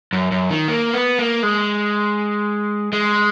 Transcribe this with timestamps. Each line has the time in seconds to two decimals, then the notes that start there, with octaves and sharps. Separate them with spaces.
0.13 F#2
0.32 F#2
0.50 D#3
0.68 A#3
0.94 B3
1.19 A#3
1.43 G#3
2.93 G#3